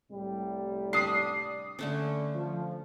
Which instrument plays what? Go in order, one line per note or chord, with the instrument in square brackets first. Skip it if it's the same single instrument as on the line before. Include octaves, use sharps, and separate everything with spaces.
[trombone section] C2 A2 G3
[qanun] D4 B5 [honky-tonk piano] D#6 C7
[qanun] D3 A3 C#4
[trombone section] F3